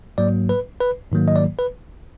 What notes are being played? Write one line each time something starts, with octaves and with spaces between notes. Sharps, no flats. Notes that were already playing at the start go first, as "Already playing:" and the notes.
G#2 F#3 A#3 D5
B4
B4
G#2 D#3 F#3 A#3
D#5
D5
B4